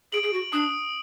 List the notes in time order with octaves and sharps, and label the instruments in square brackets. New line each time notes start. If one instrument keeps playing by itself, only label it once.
[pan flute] G#4 [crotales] D7 F#7
[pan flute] G#4
F#4
[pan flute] D4 [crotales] D#6